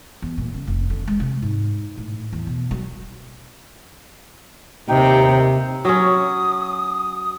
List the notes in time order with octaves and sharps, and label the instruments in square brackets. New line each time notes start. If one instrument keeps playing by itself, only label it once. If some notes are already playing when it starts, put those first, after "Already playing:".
[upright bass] E2
A#2
C#3
F1
D3
G#3
C3
G#2
A2
E2
B2
F#3
[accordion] D#2 D#4 G5 [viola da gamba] C3
[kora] F#3 C#4 [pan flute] D#6